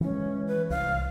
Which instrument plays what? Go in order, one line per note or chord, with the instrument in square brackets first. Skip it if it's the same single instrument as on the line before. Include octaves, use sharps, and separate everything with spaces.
[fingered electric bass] E3 G#3 [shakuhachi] C#4
[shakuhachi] B4
[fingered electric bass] C2 [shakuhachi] F5